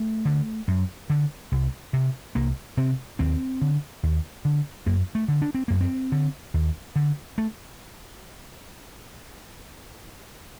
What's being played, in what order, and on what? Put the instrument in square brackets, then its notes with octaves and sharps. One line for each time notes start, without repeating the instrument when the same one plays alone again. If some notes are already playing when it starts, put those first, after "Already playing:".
Already playing: [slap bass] A3
D3
F#2
D3
C2
C3
C2 A#3
C3 C4
D#2 C4
D3
D#2
D3
F#2 A#3
A3
D3
D4
C4
F#2 A#3
C4
D3
D#2
D3
A3